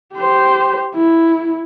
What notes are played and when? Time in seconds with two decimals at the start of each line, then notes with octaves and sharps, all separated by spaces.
0.15 G4 C5
0.95 E4